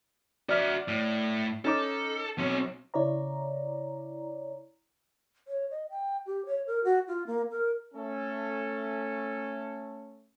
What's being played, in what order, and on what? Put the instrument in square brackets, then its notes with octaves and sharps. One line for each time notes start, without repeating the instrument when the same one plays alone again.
[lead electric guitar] F#4 E5 [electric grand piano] D5 F6
[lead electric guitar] A2
[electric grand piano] C#4 D#4 D6 [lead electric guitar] A4
[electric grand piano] B1 [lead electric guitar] C4 C#5
[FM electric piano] C#3 E4 C#5 D5 A#5
[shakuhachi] C#5
D#5
G5
G4
C#5
A#4
F#4
F4
A#3
A#4
[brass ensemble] A3 C#4 A4